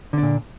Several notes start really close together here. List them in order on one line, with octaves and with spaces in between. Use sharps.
D3 D4 A#2